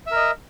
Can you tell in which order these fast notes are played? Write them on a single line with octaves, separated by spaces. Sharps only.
E5 A#4 D#5